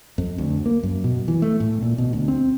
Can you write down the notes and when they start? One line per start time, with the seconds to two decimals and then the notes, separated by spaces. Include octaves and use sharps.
0.18 F2
0.38 D2
0.66 A#3
0.83 F#2
1.04 B2
1.28 E3
1.42 A3
1.60 A2
1.82 A#2
1.98 B2
2.13 D2
2.28 C4